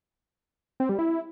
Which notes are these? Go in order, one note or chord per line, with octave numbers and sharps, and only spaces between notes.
C4
G3
E4